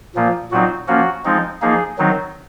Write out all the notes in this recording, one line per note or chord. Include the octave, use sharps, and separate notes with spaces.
A#2 F3 A#3
A#2 F#3 C4 D#4 F#4
F3 A#3 C#4 F#4
F3 G#3 C4 D#4
F3 A#3 D#4 G#4
D#3 F#3 C4 D#4